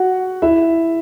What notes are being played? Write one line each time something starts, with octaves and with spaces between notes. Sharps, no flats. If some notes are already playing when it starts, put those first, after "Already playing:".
Already playing: F#4 F#5
E4 E5